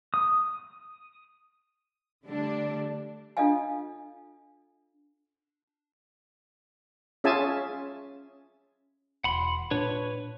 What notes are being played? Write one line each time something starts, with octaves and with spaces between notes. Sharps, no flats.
D#6
D3 G3 A3 D4
D4 F4 A4 D#5 F5 G#5
C#4 F4 G#4 E5 G#5 A5
E1 F#5 B5 C6
A#2 D4 B4 C#5